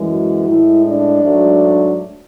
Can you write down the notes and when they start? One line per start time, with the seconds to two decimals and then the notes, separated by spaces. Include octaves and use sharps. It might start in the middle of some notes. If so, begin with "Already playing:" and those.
Already playing: F#2 E3 G#3
0.10 F#4
0.47 A2 G#3 E4
0.85 D4
1.23 G#2 F#3 A3